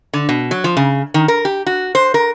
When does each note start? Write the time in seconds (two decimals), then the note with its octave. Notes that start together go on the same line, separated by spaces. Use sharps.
0.13 D3
0.29 B2
0.51 F#3
0.64 F3
0.77 C#3
1.14 D#3
1.28 A#4
1.45 G4
1.66 F#4
1.95 C5
2.14 A#4